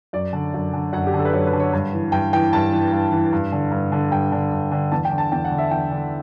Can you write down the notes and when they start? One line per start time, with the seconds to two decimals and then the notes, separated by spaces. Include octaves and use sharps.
0.13 F#2 D5
0.33 D3
0.54 F#2
0.73 D3
0.93 F#2 F#5
1.07 G4
1.14 D3
1.19 A4
1.25 B4
1.33 F#2 C#5
1.47 B4
1.53 D3
1.60 C#5
1.73 G2
1.93 E3
2.12 G2 G5
2.33 E3 G5
2.53 G2 A5
2.72 E3
2.92 G2
3.12 E3
3.33 G2
3.52 D3
3.71 G2
3.92 D3
4.11 G2 G5
4.32 D3
4.52 G2
4.72 D3
4.92 E2 A5
5.05 G5
5.11 D3
5.18 A5
5.32 E2 G5
5.45 F#5
5.52 D3
5.58 E5
5.71 E2 G5
5.91 D3